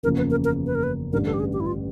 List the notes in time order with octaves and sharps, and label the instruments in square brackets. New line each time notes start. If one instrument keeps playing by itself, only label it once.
[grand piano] F#1 E2 C#3 F3 A#3 [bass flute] A#4
[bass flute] B4
A#4
A#4
B4
A#4
B4
[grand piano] A1 G2 D3 [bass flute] A#4
[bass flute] A4
G4
G#4
G4
E4
F4